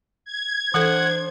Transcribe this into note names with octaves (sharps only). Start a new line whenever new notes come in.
G#6
E3 D4 A4 C5 F#5